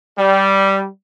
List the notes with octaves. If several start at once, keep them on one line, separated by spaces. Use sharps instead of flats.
G3